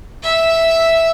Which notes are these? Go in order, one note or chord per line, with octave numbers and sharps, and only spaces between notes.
E5